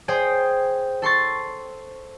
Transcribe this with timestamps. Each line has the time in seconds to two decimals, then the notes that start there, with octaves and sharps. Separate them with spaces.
0.08 G#4 C5 G5 D#6
1.02 A4 C6 C#6 A6